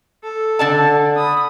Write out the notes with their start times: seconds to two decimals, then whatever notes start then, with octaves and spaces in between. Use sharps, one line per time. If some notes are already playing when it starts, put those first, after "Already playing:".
0.23 A4
0.59 D3 D5 A5
1.16 B5 D#6